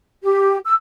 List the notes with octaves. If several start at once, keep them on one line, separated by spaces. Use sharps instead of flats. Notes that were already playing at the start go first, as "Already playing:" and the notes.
G4
E6